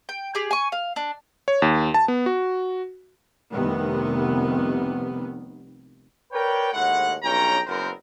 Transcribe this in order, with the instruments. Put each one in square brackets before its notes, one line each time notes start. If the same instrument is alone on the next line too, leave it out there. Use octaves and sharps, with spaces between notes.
[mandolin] G5
G4 G#4
G#5 C#6
F5
D4
[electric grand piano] C#5
D#2
A5
B3
F#4
[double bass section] F1 C2 C3 D#3 B3
[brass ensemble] A#4 B4 C#5 D5 G5
D#2 A2 G#3 F#5
B1 G2 C#4 G5 A#5
F#1 F#2 B3 C4 A#4 C5